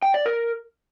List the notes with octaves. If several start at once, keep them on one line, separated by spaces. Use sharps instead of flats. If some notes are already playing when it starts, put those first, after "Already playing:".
G5
D5
A#4